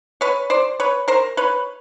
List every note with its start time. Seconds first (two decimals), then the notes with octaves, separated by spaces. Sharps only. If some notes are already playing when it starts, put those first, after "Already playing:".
0.21 B4 C#5
0.50 C5 D5
0.80 B4 C#5
1.08 A#4 C5
1.37 B4 C#5